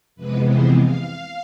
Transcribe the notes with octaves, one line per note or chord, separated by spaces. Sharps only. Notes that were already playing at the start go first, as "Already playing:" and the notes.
F2 C3 E3 G#3 B3 B4
C5
F5